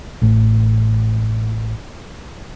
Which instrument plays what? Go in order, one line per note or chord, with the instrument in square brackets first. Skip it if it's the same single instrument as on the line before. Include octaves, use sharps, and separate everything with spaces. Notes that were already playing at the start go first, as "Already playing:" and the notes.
[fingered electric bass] A1 A2